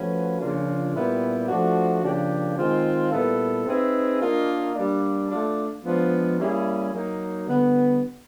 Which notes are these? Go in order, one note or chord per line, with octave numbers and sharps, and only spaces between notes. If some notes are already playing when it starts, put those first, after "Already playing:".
Already playing: F3 A3 C#4 F#4 B4
C#3 F3 A#3 D4 F4
A#2 G3 B3 E4 G4
F3 A3 D4 F#4
C#3 F3 A#3 D4 G4
D#3 G#3 C4 F4
A#2 G3 B3 E4 A4
C4 D#4 G#4 B4 E5
A#3 D4 F4 A#4 D#5
G3 A#3 D4
A3 D4 F4
F3 G#3 B3 D4 F4
G3 A#3 C#4 E4 G#4
F#3 A#3 D#4
D3 G3 B3